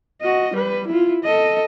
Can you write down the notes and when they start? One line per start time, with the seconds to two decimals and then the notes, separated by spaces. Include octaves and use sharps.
0.22 F#4 D#5
0.54 G3 B4
0.88 E4 F4
1.24 A4 D#5